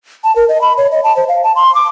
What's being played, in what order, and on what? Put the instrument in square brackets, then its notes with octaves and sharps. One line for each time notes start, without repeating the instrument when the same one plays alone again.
[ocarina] A5
A#4
D#5
B5
C#5
D#5
A5
C5
F5
A5
C6
D6